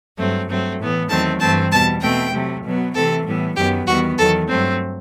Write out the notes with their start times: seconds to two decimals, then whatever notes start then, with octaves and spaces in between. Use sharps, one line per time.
0.17 G2 F#3 A3 C4
0.47 G2 F#3 A3 C4
0.78 A2 E3 B3
1.09 E2 D#3 F#3 A3 C4 A5
1.39 G2 E3 A3 C4 A5
1.70 E2 B2 G3 A5
2.01 B2 A3 C4 G5
2.32 C3 F#3 A3
2.63 B2 F#3 B3
2.94 C3 E3 A3 C4 A4
3.25 A2 E3 G3 B3
3.56 F#2 D#3 F#3 B3 G4
3.86 E2 D#3 G3 B3 F#4
4.17 E2 D#3 F#3 A4
4.48 G2 F#3 A3 C4